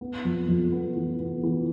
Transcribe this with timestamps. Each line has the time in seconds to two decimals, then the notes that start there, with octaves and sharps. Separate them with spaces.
0.01 B3
0.25 F2
0.49 F2
0.72 B3
0.96 E3
1.20 B3
1.43 E3